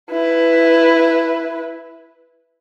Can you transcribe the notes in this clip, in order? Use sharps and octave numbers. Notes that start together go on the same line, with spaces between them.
E4 B4